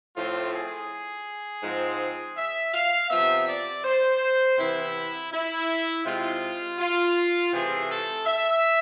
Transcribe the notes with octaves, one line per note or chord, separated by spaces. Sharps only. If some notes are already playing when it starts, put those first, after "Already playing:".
A2 F3 A3 C4 F4
G#4
G#2 F3 G#3 C4
E5
F5
C3 F3 B3 E5
D5
C5
C3 E3 B3 E4
E4
C3 G#3 C4 F4
F4
C3 E3 A3 C4 G#4
A4
E5